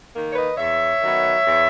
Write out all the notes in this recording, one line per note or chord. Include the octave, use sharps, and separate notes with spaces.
D#3 A#3
C#5
B4 D#5
E2 C#5 E5
D#3 F#3 B3
E2